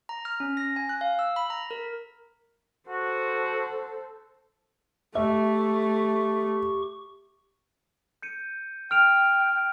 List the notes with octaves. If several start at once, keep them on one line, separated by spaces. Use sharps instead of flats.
A#5
F6
C#4
A#6
G#5
F#6
F5
E6
B5
A#5
A#4
F#4 A4 C5
A3 G4 E5 C#6
G6 C#7 D#7
G5 F6 D7 F7